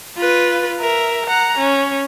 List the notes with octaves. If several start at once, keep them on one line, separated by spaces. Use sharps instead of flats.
F4 B4
A#4 E5
F#5 A#5
C#4